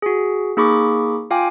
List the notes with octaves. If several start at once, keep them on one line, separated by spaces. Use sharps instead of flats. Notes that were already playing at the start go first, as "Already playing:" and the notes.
F#4 G#4
A#3 D#4 G#4 B5 C#6 D6
F4 F5 G5 G#5 D6